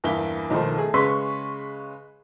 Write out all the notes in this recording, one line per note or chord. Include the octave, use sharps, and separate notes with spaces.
E2 G2 A#3 E5 G7
B1 D#3 F3 A3 C5
A3 G#4
C#3 G#3 B4 C6 C#6 B6